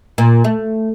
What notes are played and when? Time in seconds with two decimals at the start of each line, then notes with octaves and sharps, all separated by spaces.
0.18 A#2
0.44 A3